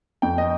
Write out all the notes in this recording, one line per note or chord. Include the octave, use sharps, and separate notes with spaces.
F2 G5
D#5